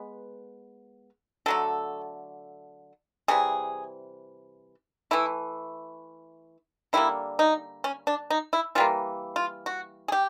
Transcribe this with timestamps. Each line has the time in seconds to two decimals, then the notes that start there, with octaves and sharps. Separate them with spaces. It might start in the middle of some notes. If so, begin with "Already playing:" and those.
Already playing: G#3 B3
1.46 D3 F#3 A3 A4
3.28 C3 E3 G3 G#4
5.11 E3 A3 E4
6.93 D3 G3 A#3 E4
7.39 D#4
7.84 C#4
8.07 D4
8.30 D#4
8.53 E4
8.75 E3 G3 A#3 F4
9.36 F4
9.66 F#4
10.08 G#4
10.12 G4